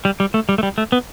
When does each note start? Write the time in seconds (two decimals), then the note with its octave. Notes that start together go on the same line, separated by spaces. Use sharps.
0.05 G3
0.20 G3
0.34 A3
0.49 G3
0.58 A3
0.63 G3
0.78 A3
0.92 B3